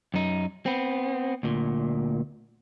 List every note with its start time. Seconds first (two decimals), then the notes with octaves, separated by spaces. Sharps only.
0.14 F#2 D#4
0.66 B3 C4
1.43 D2 A#2